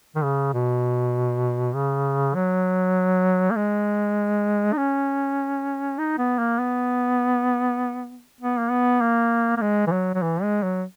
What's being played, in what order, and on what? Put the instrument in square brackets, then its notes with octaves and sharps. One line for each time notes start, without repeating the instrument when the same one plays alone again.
[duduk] D#3
C#3
B2
C#3
F#3
A#3
G#3
D#4
C#4
D#4
B3
A#3
B3
B3
A#3
B3
A#3
A#3
G#3
E3
F#3
F#3
E3
G#3
F#3